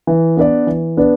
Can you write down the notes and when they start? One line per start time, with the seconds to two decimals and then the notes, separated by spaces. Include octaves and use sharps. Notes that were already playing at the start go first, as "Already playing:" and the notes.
0.07 E3
0.37 B3 D4 B4 D5
0.67 E3
0.97 B3 D4 B4 D5